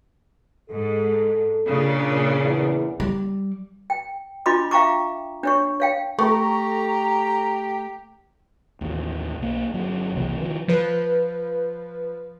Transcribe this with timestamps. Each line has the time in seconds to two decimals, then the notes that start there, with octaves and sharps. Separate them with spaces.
0.70 G#2 A4
1.67 A#2 C#3 D4
2.43 E2
3.00 G3
3.90 G5
4.46 D4 F4 D#5 B5 C6 D6
4.71 E5 F5 G5 A#5 C#6 D6
5.43 D4 C#5 C#6
5.80 C#5 F5 G5
6.19 A3 G4 A4 A#5 C#6
8.81 A1 D#2
9.38 B1 A#3
9.74 G1 F#3
10.15 E1 C2 E3 A#3
10.37 D#3 F3
10.68 F3 B4